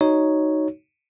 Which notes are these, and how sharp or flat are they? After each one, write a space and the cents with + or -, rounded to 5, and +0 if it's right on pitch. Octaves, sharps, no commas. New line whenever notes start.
D#4 +0 F#4 +20 C#5 +0